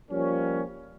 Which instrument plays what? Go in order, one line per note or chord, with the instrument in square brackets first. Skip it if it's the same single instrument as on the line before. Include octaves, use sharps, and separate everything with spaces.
[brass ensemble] F3 G3 A#3 C#4